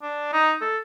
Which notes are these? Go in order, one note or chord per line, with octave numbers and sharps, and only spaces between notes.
D4
D#4
A4